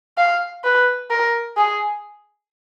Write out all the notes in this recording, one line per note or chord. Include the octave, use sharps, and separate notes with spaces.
F5
B4
A#4
G#4